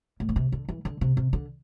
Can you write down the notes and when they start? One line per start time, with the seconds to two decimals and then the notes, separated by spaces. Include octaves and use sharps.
0.20 A2
0.29 D3
0.36 C3
0.52 D3
0.69 E3
0.85 D3
1.01 C3
1.17 C3
1.33 D3